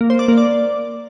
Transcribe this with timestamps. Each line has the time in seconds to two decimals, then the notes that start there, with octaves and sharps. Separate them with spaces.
0.01 A#3
0.10 C5
0.19 D5
0.28 A#3
0.38 D5